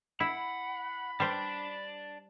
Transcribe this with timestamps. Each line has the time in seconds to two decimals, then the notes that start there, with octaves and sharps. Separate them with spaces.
0.20 E4 F#5 B5
1.20 G3 C5 D5 A5